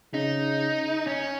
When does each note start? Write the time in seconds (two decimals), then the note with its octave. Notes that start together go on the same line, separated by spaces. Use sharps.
0.13 C#3 D#4
1.07 C#4